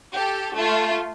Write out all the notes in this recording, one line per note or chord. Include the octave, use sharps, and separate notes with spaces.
G4 A4
A3 F4